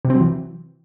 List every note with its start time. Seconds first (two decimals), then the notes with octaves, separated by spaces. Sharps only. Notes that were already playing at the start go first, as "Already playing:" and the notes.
0.05 C3
0.10 C4
0.15 F#3
0.21 E3